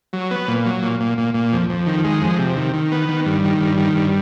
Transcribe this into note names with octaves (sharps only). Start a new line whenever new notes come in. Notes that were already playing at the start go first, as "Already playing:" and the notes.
F#3
B3
A#2
F#3
A#2
A#2
A#2
A#2
F2
F2
D#3
G#3
F2
C3
D#3
D#3
B3
D#3
G2
D#3
G2
D#3
G2